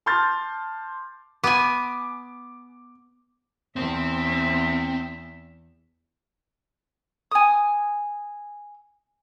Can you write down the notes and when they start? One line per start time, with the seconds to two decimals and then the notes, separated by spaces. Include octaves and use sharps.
0.06 A5 C6 D6 F6 G6 A6
1.44 B3 G#5 D6
3.76 E2 C4 E5
7.32 G#5 D#6